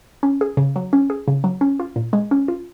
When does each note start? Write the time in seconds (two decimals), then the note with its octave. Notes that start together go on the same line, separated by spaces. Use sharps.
0.23 C#4
0.41 G#4
0.57 C#3
0.76 F#3
0.93 C#4
1.10 G#4
1.28 C#3
1.44 F#3
1.61 C#4
1.80 F4
1.96 A#2
2.13 G#3
2.31 C#4
2.48 F4